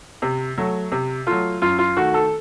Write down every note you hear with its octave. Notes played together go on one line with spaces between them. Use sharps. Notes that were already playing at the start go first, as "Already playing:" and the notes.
C3
F#3 A3
C3
F#3 A3 F4
F#2 F4
F4
D#3 A3 F#4
A4